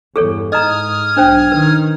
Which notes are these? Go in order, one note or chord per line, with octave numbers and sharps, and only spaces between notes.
E2 G2 G#4 A4 C#5
G#2 D#5 A#5 D#6 F6 G#6
B1 D4 C5 G5
D#3 B4